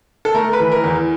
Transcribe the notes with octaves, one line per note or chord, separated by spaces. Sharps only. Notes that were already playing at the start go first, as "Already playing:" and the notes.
A4
A3 A#4
B4
E3
A#4
E2